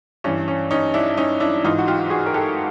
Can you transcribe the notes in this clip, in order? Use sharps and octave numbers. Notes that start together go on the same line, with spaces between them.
G2 E3 C#4
C#4
C#4 D#4
D4 E4
C#4 D#4
D4 E4
G#2 E3 D#4 F4
F#4
F4 G4
F#4 G#4
A#4
G4 A4